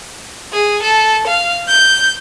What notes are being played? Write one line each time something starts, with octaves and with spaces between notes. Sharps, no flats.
G#4
A4
F5
G6